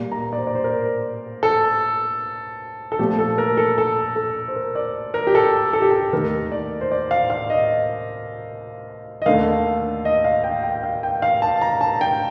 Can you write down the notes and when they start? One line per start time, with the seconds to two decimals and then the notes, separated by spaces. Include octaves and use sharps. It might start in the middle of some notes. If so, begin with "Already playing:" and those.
Already playing: A#2 G3 A#3
0.12 A#5
0.33 D5
0.38 C5
0.47 D5
0.55 C5
0.64 A#4
1.43 A4
2.92 A4
2.99 A#2 F3 A3 G4
3.19 A4
3.38 A#4
3.57 A4
3.78 A4
4.16 A4
4.48 C5
4.56 A#4
4.75 D5
5.14 A#4
5.27 G4
5.35 A4
5.73 A4
5.82 G4
5.91 A4
6.13 D#2 D#3 A3 A#4
6.52 D5
6.81 C5
6.92 D5
7.11 F5
7.30 F5
7.50 D#5
9.22 D#5
9.26 D#2 D3 A3 F5
10.05 D#5
10.24 F5
10.44 G5
10.63 G5
10.83 F5
11.03 G5
11.22 F5
11.42 A5
11.61 A#5
11.81 A5
12.01 G5